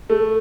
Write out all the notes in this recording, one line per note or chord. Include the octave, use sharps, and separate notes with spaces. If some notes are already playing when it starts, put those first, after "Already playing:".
A3